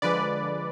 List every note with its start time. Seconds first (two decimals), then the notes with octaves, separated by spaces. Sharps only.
0.02 D3 F3 G#3 B4 D5